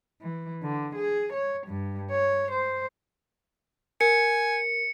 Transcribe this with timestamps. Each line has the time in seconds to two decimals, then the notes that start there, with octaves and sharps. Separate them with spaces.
0.22 E3
0.63 D3
0.95 G#4
1.33 C#5
1.67 G2
2.11 C#5
2.51 C5
4.01 A#4 G#5 C#7